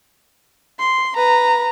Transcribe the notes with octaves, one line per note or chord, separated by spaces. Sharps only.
C6
B4 A#5